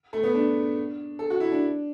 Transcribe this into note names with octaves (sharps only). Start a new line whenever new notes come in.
A3
B3
D4
A4
F#4
E4
D4